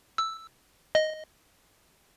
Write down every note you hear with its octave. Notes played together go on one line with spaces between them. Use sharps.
E6
D#5